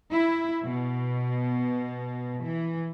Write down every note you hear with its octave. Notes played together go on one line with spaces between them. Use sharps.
E4
B2
E3